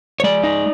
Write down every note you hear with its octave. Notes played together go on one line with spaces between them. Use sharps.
C#5
G#3 D5
D#4